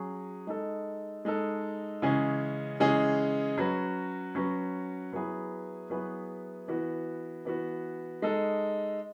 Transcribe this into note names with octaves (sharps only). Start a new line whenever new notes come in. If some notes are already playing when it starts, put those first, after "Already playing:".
Already playing: F#3 C#4 G#4
G#3 D#4 A4
G#3 D#4 A4
C#3 E3 G#3 C#4 G#4
C#3 E3 G#3 C#4 G#4
F#3 C#4 F#4 B4
F#3 C#4 F#4 B4
F#3 B3 E4 G#4 B4
F#3 B3 E4 G#4 B4
E3 B3 F#4
E3 B3 F#4
G#3 D#4 A4